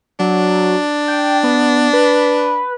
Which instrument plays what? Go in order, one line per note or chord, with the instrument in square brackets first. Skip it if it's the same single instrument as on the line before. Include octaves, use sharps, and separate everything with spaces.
[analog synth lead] F#3 [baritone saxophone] D4
[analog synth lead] G5
B3
B4